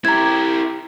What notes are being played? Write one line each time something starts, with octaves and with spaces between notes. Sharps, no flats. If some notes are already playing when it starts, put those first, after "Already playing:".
E4 G4 A#5 G#6